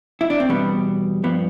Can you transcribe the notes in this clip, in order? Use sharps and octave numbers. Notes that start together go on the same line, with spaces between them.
E4
D4
C4
E2 B2 G3 B3
G2 F3 B3